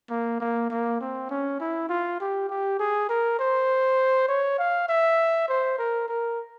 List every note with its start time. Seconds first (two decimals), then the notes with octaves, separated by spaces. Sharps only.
0.10 A#3
0.40 A#3
0.70 A#3
1.01 C4
1.30 C#4
1.60 E4
1.89 F4
2.20 G4
2.49 G4
2.80 G#4
3.09 A#4
3.39 C5
4.29 C#5
4.59 F5
4.89 E5
5.49 C5
5.79 A#4
6.08 A#4